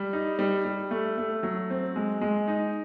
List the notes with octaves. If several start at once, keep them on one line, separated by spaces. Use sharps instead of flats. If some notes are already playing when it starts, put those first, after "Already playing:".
Already playing: G3
D#4
G3
G3
A3
A3
F#3
C4
G#3
G#3
D#4